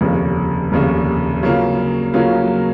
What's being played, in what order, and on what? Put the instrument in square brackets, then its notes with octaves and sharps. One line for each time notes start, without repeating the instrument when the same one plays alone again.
[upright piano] F1 D#2 C#3
F1 D#2 C#3
C#3 F#3 A#3 C#4 F4
C#3 F#3 A#3 C#4 F4